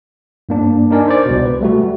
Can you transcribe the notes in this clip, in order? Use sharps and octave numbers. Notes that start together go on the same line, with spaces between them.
G2 A#3 D4
D4 D#4 A#4 D5 G#5
C5 D5
C2 B2
B4
G3 A3 F#4